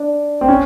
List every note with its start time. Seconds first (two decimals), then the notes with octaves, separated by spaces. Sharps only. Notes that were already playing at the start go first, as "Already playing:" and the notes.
Already playing: D4
0.41 C4
0.48 C#4